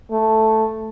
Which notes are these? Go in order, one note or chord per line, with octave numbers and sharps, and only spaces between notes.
A3